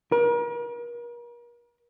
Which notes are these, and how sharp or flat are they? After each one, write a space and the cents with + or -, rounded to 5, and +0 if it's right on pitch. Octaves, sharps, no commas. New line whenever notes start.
A#4 +40